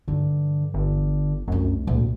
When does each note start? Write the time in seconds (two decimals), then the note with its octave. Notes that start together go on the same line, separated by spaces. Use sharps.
0.08 G2 D3 E3
0.74 G1 D3
1.48 C2 F#2 A3 D4
1.87 D2 A#2